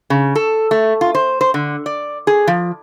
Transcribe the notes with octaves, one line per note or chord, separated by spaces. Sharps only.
C#3
A4
A3
F4
C5
C5
D3
D5
G#4
F3